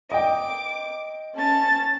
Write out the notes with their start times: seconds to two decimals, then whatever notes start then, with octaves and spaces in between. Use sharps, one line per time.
0.12 D#5 G5 D6
1.34 C#4 A5 A6